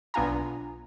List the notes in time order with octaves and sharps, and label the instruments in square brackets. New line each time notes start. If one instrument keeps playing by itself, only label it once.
[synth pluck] B1 B3 D4 F4 G#5 A#5